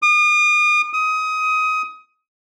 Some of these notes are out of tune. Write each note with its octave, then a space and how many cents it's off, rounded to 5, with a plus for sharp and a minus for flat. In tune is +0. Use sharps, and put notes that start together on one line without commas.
D#6 -40
D#6 +20